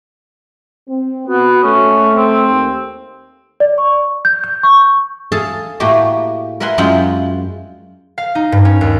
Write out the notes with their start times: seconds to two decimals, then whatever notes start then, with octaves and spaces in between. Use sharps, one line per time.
0.88 C4
1.28 B3 F#4
1.63 A3 C#4
2.15 C4
2.48 D#2
3.60 D5
3.78 C#6
4.25 G6
4.44 G6
4.63 C#6
5.32 G#4 A4 F5 A5
5.80 A2 A3 A#3 F#4 G4
6.60 A#4 B4 E5 F#5 G#5 C6
6.78 F#2 G#3 E4 F4 F#5 G5
8.18 F5
8.35 D#4
8.52 G2
8.65 C#4
8.81 D#2